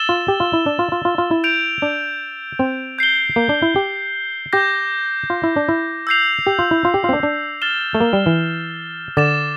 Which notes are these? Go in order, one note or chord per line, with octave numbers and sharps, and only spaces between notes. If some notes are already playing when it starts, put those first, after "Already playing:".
Already playing: E6 A6 E7 G7
F4
G4
F4
E4
D4
F4
F4
F4
F4
E4
G6 D7 F7
D4
C4
G6 C7 G7
A#3
D4
E4
G4
G4 D6 G6 A#6
F4
E4
D4
E4
E6 G6 C7 F7
G4
F4
E4
F4
G4
F4
C4
D4
D4
F6 A6 E7 G7
A3
A#3
G3
E3
D3 D6 A6 E7